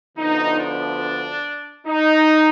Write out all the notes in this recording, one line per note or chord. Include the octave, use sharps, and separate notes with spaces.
D2 D3 F3 B3 D#4
D4
D#4